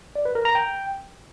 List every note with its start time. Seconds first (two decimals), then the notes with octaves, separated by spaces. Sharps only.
0.16 D5
0.25 B4
0.35 A#4
0.45 A#5
0.55 G5